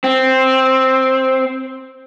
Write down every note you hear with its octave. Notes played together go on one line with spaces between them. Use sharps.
C4